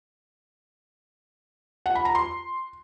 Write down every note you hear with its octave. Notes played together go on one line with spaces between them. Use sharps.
F#5
B5
A#5
C6